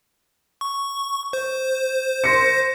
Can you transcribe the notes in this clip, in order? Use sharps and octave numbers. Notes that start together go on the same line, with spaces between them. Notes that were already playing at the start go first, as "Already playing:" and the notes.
C#6
C5
C6 A#6 C#7